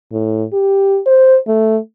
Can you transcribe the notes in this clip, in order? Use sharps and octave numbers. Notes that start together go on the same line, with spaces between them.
A2
G4
C5
A3